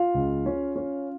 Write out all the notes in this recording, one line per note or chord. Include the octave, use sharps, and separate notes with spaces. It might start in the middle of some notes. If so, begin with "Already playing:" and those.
Already playing: F4 F5
C#2
C#4
C#4